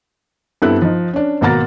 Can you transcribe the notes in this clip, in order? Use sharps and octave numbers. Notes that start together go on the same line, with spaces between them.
G2 B3 C4 E4 A4 F#6
F3 D#4
C#4 D4
G#1 B2 A#3 F#5 A#5 A6